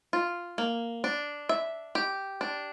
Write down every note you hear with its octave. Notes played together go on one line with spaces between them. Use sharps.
F4
A#3
D4
E5
G4
D4